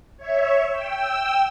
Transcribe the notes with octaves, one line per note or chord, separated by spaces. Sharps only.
C#5 E5
G5 E6